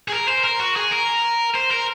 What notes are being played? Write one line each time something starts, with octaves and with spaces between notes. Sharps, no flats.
G#4
A#4
C5
A#4
F#4
G#4
A#4
C5
A#4